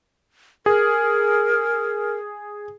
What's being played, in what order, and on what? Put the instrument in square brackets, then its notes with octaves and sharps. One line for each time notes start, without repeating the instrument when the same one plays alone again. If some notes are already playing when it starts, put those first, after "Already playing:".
[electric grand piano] G#4 [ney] A#4